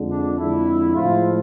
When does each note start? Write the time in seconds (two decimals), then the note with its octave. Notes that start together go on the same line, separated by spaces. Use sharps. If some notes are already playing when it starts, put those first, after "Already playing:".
Already playing: F2 D3 F3 G#3
0.10 D4
0.38 F2 D3 G#3 E4
0.95 A2 F3 G#3 F4